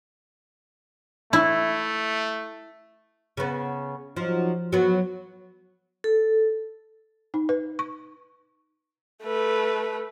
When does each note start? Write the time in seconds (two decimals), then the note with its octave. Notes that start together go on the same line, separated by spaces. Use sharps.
1.33 A3 E4
3.37 C#3 B3
4.17 F3 F#3 D#4
4.72 F#3 B3 F#4
6.04 A4
7.34 D#4
7.49 B4
7.79 C#6
9.23 A3 B4